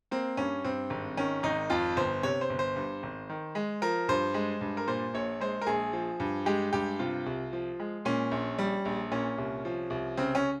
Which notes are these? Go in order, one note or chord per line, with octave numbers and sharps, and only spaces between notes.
A#3 C4
G2 C#4
G2 C4
G#1
D#3 C#4
G#1 D#4
F2 F4
G1 C5
C3 C#5
C5
G1
C5
G2
G#1
D#3
G#3
F3 A#4
G2 C5
G#3
G2
A#4
A#2 C5
A#1 C#5
G#3 C5
A#4
A#1 G#4
F3
G2
G#3 G4
G2 G4
C3 F4
C2
F3
G#3
A#2 C#4
A#1
G3
A#1
A#2 C#4
C2
F3
C2
C#3 C4
C#4